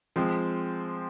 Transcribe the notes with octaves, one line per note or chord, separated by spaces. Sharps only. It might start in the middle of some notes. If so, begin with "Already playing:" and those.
F3 G#3 C4